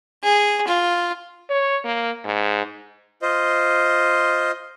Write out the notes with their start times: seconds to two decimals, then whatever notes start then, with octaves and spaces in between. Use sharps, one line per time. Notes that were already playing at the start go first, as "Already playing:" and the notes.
0.23 G#4
0.67 F4
1.50 C#5
1.84 A#3
2.24 G#2
3.22 F4 C5 D#5